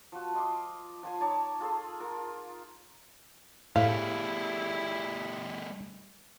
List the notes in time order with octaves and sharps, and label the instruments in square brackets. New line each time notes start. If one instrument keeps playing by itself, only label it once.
[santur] F3 F#4
F4 D#5 C6 D6
F3 G#5 C6
D#4 C#5 A5 D6
F4 G#4 A4 C6
F4 A#4
[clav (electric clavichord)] A2 [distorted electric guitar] G3 A3 [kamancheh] E4 [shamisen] F5